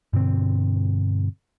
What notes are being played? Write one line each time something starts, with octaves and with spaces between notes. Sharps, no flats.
G2 B2 D3 C4